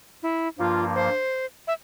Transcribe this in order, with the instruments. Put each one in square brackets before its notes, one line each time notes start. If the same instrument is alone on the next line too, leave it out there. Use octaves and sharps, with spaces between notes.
[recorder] E4
[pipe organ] G2 F3 A#3 [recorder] F4
[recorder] C5
E5